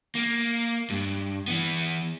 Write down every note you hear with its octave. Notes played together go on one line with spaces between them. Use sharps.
A#3
G2
E3 B3